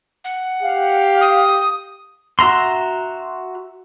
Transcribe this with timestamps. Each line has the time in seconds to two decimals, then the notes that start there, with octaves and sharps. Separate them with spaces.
0.24 F#5
0.63 G4 F5
1.21 D#6
2.39 F#4 E5 A#5 C6